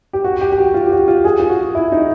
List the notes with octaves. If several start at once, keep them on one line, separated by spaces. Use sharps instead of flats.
G4
F#4
G4
G4
F#4
F4
G4
F#4
F4
G#4
F4
F#4
E4
D#4